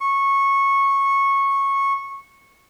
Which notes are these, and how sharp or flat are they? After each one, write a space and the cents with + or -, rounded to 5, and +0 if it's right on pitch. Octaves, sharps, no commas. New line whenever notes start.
C#6 -15